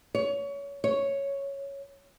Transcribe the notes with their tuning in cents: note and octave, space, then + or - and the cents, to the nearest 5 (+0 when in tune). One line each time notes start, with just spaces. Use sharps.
C#5 +25
C#5 +0